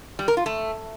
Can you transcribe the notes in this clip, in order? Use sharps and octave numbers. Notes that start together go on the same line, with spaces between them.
G3
A#4
F4
A3